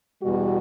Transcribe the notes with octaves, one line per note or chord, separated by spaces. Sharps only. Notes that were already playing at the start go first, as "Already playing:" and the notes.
E2 B2 G3 F#4